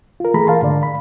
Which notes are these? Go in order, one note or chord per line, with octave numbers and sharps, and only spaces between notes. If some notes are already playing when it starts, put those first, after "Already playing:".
F4 A#4
E3 A3 G#4 A#5 B5
A#4 F5 A5 C6
G#2 D3 D5
B5